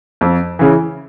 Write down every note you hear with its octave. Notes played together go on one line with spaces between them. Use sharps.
F2
C#3 E3